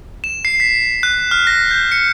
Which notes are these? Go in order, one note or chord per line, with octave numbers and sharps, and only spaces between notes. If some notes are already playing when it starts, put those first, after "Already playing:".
E7
C7
B6
F#6
F6
A#6
G6
C#7